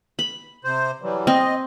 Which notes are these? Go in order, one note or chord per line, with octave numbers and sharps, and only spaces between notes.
B5
C3 C5
E3 F#3 G3
C4 D#5